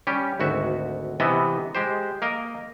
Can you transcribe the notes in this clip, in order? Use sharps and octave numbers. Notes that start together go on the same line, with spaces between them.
G3 C#4 G4
G#1 D2 F#4 E5
C3 E3 B3 D#5 E5
G#3 G4 C5
A#3 A#4 D#5